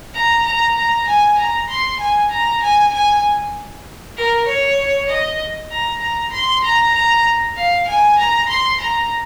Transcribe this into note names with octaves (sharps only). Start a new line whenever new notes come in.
A#5
A#5
A#5
G#5
A#5
C6
G#5
A#5
G#5
G#5
A#4
C#5
D#5
A#5
A#5
C6
A#5
A#5
F5
G#5
A#5
C6
A#5